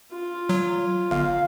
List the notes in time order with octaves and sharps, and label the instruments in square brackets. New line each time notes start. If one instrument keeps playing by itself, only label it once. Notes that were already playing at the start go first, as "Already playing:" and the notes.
[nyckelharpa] F4
[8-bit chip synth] F#3
[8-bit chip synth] G1 [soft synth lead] F5